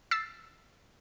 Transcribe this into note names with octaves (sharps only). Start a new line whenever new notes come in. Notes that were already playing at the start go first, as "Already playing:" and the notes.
E6 A6 B6 C7